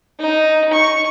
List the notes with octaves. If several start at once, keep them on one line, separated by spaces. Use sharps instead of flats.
D#4
C#6